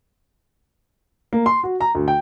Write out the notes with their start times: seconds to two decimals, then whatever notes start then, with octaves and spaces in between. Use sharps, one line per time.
1.33 A#3
1.46 C6
1.63 F#4
1.81 A#5
1.95 D2
2.08 G5